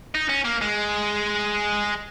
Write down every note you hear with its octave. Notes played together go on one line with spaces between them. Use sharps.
D#4
C#4
A#3
G#3